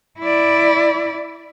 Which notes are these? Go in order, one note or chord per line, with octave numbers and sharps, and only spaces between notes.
E4 D5